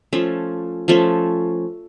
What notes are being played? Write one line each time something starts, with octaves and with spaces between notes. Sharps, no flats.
F3 A3 C#4
F3 A3 C#4